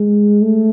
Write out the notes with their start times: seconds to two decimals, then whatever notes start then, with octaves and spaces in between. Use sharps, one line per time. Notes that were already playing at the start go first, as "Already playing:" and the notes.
Already playing: G#3
0.42 A3